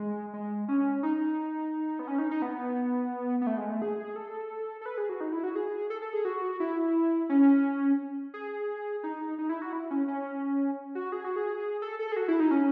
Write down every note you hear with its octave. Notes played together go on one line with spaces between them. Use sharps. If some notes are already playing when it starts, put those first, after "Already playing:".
Already playing: G#3
G#3
C#4
D#4
B3
C#4
D#4
D#4
B3
B3
A3
G#3
A3
G#4
A4
A4
B4
G#4
F#4
D#4
E4
F#4
G#4
A4
A4
G#4
F#4
E4
C#4
G#4
D#4
D#4
E4
F#4
E4
C#4
C#4
F#4
G#4
F#4
G#4
A4
A4
G#4
F#4
E4
D#4
C#4